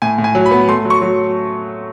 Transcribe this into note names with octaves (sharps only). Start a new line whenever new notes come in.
A2 G#5
A2
G#5
F#3
B5
B3
A3 C6
F#3
C#6
F#3